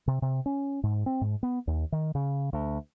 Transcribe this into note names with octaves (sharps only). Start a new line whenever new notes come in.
C3
C3
C#4
G#2
C4
G#2
B3
D#2
D#3
C#3
D2